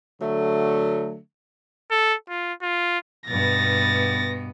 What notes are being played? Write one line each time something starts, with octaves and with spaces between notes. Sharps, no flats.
D3 F#3 A3
A4
F4
F4
G2 B2 B3 A6 A#6